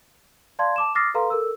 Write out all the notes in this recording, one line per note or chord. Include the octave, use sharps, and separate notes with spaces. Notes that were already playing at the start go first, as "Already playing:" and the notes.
D5 F5 A5 C6 G#6
A5 D6 E7
D6 D#6 F6 A6 A#6 C7
A4 B4 F5 A#5 C6
A4 A#4 E6